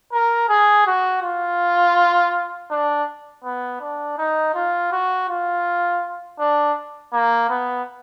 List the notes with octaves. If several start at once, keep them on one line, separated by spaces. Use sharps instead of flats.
A#4
G#4
F#4
F4
D4
B3
D4
D#4
F4
F#4
F4
D4
A#3
B3